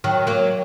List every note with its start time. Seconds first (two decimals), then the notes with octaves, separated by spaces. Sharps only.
0.04 D#3 F#3
0.27 F#3 A#3